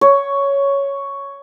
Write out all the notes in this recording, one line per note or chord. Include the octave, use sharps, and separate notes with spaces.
C#5